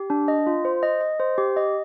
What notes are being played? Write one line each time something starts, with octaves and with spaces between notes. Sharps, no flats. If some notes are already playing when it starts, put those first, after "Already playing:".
Already playing: G4
D4
D#5
F4
C5
D#5
D#5
C5
G4
D#5